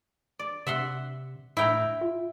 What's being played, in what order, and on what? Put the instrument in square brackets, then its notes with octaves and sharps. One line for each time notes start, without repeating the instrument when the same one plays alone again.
[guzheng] D5
[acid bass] C3 [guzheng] E5 F#5 C6
[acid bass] A2 [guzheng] E4 G5 A#5
[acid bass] F4